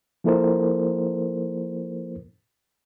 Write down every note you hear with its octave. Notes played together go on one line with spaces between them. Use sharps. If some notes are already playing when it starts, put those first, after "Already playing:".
F3 A#3 E4 A4 A#4 C5